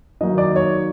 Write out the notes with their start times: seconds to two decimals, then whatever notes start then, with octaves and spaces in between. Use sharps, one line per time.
0.21 D#3 F#3 A#3 D#4 D#5
0.38 D5
0.56 C#5